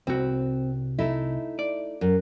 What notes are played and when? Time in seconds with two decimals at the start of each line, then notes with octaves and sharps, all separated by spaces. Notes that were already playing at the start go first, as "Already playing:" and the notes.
0.07 C2 C4 F#4
0.99 A3 D#4 E4
1.59 D5
2.01 F#2